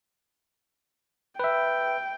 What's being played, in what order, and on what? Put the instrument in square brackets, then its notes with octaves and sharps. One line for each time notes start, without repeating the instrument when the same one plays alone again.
[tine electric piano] B4 E5 [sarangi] G5